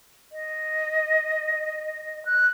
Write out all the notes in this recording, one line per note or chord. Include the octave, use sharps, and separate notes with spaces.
D#5
F#6